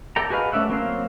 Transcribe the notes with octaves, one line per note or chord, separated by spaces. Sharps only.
A4 D5 G5 A#5
F#4 G#4 B4 D#5 F5
A3 C#4 D5 E5 F#5
F#3 A#3 C4 F5